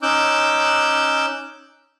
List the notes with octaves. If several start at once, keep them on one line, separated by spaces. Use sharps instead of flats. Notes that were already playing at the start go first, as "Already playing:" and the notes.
C#4 D#4 D6 E6 F#6 G6